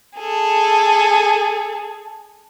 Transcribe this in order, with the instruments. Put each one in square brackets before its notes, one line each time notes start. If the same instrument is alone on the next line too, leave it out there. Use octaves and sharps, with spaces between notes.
[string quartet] G#4 A4